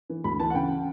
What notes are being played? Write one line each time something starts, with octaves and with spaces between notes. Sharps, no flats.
E3
D2 B5
E3 A5
F#5
C#3 G5